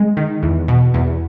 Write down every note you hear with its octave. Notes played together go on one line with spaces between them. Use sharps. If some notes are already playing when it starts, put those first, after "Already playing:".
Already playing: G#3
D#3
E2
B2
E2